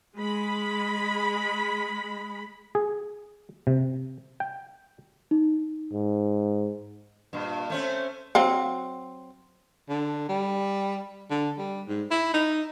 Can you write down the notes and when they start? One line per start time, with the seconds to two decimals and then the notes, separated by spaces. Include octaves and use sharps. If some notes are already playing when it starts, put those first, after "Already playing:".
0.19 G#3 B5
2.75 G#4
3.67 C3
4.40 G5
5.31 D#4
5.93 G#2
7.33 G2 A#2
7.70 A3 C4 C#4
8.35 F#3 C4 F5
9.89 D3
10.29 G3
11.30 D3
11.58 G3
11.88 G#2
12.11 E4
12.34 D#4